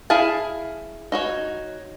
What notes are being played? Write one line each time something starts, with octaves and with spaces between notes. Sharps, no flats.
E4 G#4 F5 A5
D#4 F#4 C#5